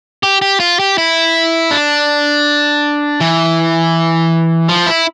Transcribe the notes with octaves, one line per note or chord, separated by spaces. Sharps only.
G4
G4
F4
G4
E4
D4
E3
F3
E4